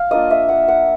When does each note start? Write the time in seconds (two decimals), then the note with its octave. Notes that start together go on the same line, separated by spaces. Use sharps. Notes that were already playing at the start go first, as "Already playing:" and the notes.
Already playing: F5
0.11 A#3 D4 F4 D#5
0.31 E5
0.49 F#5
0.68 F#5